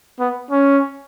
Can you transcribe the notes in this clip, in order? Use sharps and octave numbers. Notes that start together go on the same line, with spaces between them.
B3
C#4